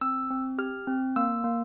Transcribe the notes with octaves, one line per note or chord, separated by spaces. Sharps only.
C4 E6
C4
G4 F6
C4
A#3 E6
A#3